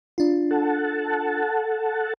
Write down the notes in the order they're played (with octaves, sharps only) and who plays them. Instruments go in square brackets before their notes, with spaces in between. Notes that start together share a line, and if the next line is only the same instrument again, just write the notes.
[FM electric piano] D4 F4
[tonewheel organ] A4 F#5 A5